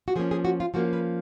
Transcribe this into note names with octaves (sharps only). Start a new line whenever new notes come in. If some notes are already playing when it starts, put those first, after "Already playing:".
F#4
F3 A#3 C#4 G#4
G#4
F#4
F4
F3 A#3 C#4 F#4
B4